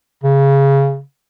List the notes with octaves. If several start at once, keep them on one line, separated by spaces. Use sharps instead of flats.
C#3